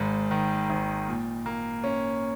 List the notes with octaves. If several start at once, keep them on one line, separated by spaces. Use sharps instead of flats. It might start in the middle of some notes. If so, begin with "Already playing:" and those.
Already playing: G#1 G#2
D#3
G#1
A#2
A#3
C#4